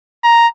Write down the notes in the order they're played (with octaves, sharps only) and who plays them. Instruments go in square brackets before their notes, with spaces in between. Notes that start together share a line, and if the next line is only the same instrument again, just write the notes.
[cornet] A#5